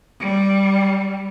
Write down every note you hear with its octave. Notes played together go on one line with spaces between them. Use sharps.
G3